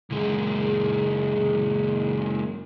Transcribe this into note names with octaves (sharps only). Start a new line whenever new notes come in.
C#2 F#2